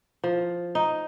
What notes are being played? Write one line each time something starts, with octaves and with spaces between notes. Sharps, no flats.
F3
D#4